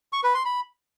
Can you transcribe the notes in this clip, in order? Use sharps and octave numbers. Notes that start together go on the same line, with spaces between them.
C#6
B4
C6
B5